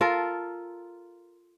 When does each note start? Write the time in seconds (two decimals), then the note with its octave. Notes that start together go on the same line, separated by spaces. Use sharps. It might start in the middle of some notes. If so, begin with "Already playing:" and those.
0.01 F4 A4 A#4 F5